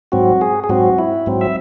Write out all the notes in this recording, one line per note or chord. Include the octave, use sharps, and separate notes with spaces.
G#2 F#3 C4 F#4
G#4
G#4
G#2 F#3 C4 F#4
E4
G#2 F#3 C4
E5